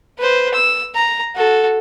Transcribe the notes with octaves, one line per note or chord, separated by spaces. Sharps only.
B4 C5
E6
A#5
F#4 A4